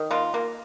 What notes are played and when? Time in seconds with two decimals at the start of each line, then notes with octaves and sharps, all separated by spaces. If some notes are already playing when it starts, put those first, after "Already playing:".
Already playing: D#3
0.11 A#3 F4
0.34 A#3